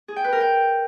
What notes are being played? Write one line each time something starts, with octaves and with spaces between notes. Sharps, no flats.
G#4
G5
B4
A#4
G5